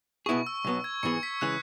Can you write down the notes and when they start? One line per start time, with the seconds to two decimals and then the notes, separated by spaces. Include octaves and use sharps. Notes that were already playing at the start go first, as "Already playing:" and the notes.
0.26 B2 B3 E4 G#4 C#6
0.47 E6
0.65 B1 B2 F#3 B3
0.84 G#6
1.03 G#2 E3 B3 G#4 C#6 C#7
1.23 B6
1.41 C#3 E3 G#3 F#6